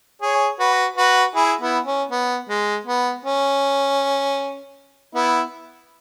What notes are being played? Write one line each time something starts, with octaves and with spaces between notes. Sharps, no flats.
G#4 C#5
F#4 B4
F#4 B4
E4 G#4
B3 E4
C#4
B3
G#3
B3
C#4
B3 E4